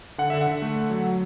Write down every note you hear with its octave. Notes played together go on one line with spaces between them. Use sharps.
D3 F#5
D3 E5
F#5
D3
A3
A3
F#3
F#3